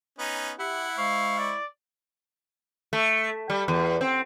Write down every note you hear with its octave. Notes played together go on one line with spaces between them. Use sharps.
B3 C#4 D#4
E4 G4 E5 F#5
G#3 C5 F5 C#6
D5
A3
G3
E2
C4